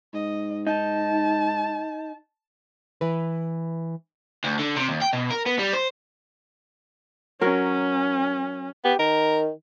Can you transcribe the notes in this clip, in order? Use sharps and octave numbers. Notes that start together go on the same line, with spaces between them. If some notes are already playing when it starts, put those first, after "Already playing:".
G#2 D#5
D#4 A5
E3 B4
D2
D3
C3
D#2
G5
B2
A#4
B3
G3
C5
F#3 C#4 A#4
B3 G4
D#3 A#4